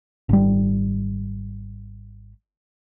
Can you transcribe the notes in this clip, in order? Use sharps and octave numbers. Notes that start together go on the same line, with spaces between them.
G#1 G3